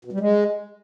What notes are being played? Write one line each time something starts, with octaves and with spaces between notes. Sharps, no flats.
B2
G3
G#3